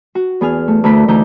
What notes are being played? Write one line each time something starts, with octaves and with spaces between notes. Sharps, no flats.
F#4
E2 B3 G#4 G#5 F6
A3
D2 A3 A#4 F#5 B5
D2 E3 A3 D#4 A#5 G6